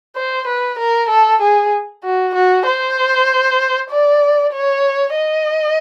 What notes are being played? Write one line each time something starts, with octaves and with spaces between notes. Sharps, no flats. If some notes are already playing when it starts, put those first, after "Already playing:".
C5
B4
A#4
A4
G#4
F#4
F#4
C5
D5
C#5
D#5